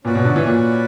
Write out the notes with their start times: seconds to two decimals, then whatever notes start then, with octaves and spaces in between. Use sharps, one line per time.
0.05 A#2 C#4 F#4 B4 D5
0.15 B2
0.25 D3
0.36 E3
0.46 A#2